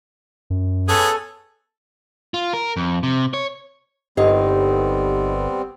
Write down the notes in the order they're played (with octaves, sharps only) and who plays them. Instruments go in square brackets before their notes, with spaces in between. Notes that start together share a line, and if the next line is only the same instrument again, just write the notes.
[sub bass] F#2
[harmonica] B3 C#4 G#4 [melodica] A4
[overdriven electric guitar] F4
A#4
F2
C3
C#5
[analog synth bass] G1 [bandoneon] G3 B3 C4 [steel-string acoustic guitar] D#4 D#5 [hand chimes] G4